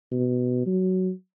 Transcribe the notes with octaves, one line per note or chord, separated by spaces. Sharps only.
B2
F#3